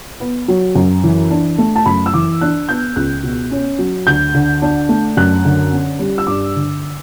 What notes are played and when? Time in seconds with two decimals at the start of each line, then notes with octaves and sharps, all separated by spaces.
0.20 B3
0.48 F#3
0.75 F#2
1.04 E3
1.31 D4
1.58 A3
1.76 A5
1.86 F#2 B5
2.06 E6
2.14 E3 D6
2.41 D4 F#6
2.68 B3 G6
2.96 C#2 F#6
3.23 B2
3.51 C#4
3.79 F#3
4.07 D2 G6
4.34 D3
4.62 D4
4.89 A3
5.17 F#2 F#6
5.45 D3
5.73 C#4
5.99 G3
6.18 E6
6.27 G2 D6
6.56 D3